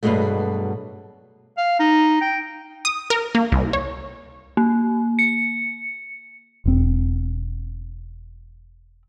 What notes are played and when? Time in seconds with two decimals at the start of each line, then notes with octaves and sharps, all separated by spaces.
0.03 G2 B2 D#3 F#3 G#3 A3
1.57 F5
1.80 D#4
2.21 G5
2.85 D#6
3.10 A#4
3.35 A#3
3.52 C2
3.73 C#5
4.57 A#3
5.19 C#7
6.66 E1 C4